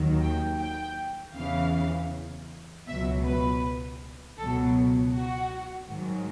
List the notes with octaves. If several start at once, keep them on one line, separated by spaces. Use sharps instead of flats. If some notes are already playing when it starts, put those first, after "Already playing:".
Already playing: D#2 D#3 F#3
G5
G5
E2 C#3 E3 F5
C#2 B2 F#3 E5
B4
C#2 B2 F#3 A4
F#4
G#2 D#3 F#3